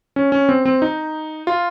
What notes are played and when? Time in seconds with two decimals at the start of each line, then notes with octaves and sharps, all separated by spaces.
0.16 C#4
0.32 C#4
0.49 C4
0.65 C4
0.82 D#4
1.47 F4